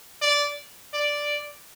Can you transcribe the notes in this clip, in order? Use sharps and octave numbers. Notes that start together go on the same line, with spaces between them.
D5
D5